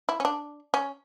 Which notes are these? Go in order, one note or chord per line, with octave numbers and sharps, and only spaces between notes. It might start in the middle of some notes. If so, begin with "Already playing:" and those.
E4
C#4
D4
C#4